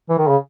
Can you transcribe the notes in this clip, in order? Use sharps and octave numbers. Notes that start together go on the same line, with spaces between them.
E3
D#3
C#3